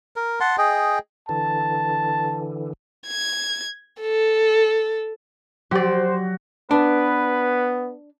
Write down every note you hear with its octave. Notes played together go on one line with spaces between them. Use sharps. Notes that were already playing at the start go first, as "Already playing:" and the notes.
A#4
F#5 A5 C6
G#4 D#5 G5
D3 E3 A5
G#6
A4
F#3 F#4 G4 C5 D5
B3 D4 B4